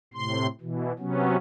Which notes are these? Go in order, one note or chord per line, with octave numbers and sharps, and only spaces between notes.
A2 C3 C6
B2 E3
C3 F#3 B3 C#4